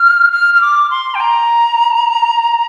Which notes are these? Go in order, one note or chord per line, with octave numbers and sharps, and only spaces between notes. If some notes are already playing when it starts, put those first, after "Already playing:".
Already playing: F6
F6
F6
D6
C6
G5
A#5